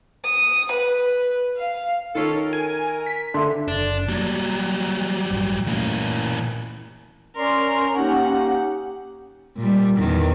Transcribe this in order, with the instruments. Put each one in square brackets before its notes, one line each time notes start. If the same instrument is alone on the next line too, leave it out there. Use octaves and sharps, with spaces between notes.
[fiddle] D#6
B4
F5
[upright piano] D#3 [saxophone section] C#4 F4 A4
[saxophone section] A#4
[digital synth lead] G#5
B6
[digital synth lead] D3 [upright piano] A4 E5 C6
[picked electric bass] F#1 [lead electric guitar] D4
[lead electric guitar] F#3 G3 [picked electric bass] A#3
[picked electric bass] A1 G2
[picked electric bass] A#2 A3 C#4 [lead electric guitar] E3 A#3
[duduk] C#4 [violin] A#4 [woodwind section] C#5 D5 C6
[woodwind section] A#3 D#4 G4 [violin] F#5
[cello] A#2 G3
E2 D#3